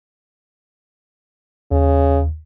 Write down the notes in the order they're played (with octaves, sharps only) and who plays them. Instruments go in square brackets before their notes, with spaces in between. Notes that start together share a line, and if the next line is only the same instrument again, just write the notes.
[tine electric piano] D#2 [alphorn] C#3